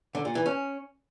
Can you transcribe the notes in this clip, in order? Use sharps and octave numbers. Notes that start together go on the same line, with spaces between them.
D3
A#2
E3
C#4